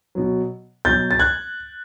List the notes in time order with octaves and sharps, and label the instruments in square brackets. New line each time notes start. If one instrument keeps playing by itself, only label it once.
[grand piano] B2 F#3
B2 F#3 G6 A6
A6
F#6 G#6